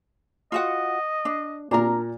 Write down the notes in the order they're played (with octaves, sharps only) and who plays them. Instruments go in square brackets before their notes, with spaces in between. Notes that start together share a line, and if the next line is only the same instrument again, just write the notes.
[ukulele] F4 F#4 F#5 [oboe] D#5
[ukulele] D4
[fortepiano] A#2 A#5 [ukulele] D4 A#4